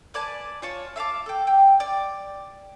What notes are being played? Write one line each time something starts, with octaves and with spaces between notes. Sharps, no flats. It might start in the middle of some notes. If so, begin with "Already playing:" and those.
B4 D5 G#5 A5
F4 C#5 A5
E5 F5 A5 D6
A4 G5
G5
D5